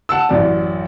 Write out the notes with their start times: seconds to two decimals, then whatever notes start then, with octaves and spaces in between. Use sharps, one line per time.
0.09 F#5 A5 E6
0.29 A1 F#2 D5